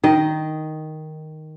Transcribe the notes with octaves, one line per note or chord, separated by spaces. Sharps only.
D#3 D#5